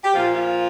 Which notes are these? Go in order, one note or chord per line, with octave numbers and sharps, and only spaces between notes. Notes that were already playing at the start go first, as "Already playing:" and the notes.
G4
A#2 F3 F4
F4